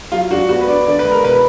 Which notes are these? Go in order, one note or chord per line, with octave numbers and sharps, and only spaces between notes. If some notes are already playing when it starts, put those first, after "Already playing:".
F#3 F4
D4 F#4
B3 F#4
B4
D4 D5
D3 D5
B4
G#3
A#4
B2 B4